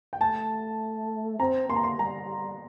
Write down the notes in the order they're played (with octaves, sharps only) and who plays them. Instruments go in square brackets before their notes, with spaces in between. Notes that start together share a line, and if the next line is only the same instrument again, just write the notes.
[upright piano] G5
[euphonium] A3 [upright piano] A5
[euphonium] C4 [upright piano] A#5
[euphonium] A#3 [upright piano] C6
[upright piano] A#5
C6
[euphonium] G3 [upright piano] A#5